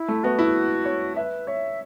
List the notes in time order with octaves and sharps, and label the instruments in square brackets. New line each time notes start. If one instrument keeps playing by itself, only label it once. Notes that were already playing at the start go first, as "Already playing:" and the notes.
Already playing: [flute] E4
[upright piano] A3
[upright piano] B3 [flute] F#4
[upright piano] E4
C#5
[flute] B4 [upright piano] E5
[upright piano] C#5 [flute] E5